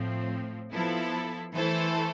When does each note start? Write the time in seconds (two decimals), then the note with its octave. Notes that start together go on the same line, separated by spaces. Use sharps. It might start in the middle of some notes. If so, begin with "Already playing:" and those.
Already playing: A2 F3 C4
0.73 F3 B3 E4 A4
1.55 E3 A3 E4 A4 C5